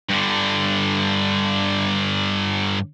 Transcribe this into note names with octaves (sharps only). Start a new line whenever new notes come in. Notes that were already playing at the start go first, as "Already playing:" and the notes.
G2 D3